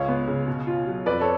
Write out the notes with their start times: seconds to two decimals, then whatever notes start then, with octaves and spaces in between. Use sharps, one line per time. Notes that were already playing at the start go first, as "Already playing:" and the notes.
Already playing: C#2 C#5 F5
0.08 B3
0.27 C#3
0.48 B2
0.67 F4
0.87 F#3
1.06 F2 B4 D5
1.21 A4 C#5